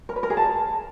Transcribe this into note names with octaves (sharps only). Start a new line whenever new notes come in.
A#4
B4
A#4
G#4
A5